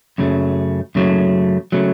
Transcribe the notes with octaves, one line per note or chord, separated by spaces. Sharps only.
F#2 C#3 F#3 A3
F#2 C#3 F#3 A3
C#3 F#3 A3